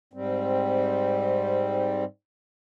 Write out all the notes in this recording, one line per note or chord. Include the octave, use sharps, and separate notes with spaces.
G#2 G3 C4